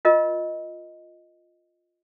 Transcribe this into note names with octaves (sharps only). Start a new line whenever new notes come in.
F4 A#4 D#5